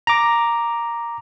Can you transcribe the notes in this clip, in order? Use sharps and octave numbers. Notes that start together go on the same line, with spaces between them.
A#5 D6